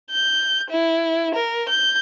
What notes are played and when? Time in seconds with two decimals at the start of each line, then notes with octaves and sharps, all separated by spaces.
0.12 G6
0.70 E4
1.35 A#4
1.69 G6